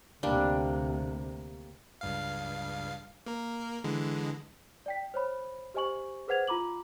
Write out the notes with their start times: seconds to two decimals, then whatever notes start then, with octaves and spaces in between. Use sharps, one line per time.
0.23 D2 C3 G3 A#3 D4
2.01 C#2 G2 F5
3.26 A#3 A#4
3.84 D3 E3 G#3
4.86 D5 G5 B6
5.14 C5 C#5 B5
5.74 G4 C5 D#5 G#5 C#6 F#7
6.28 G#4 B4 C5 F#5 G#6 F7
6.47 F4 A#5 B5 D6 F#7